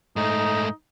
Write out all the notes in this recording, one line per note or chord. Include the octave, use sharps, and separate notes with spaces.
G#2 A3 D#4